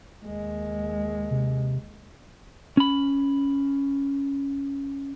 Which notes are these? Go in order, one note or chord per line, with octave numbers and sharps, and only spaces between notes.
D#2 G#3
C3
C#4 B5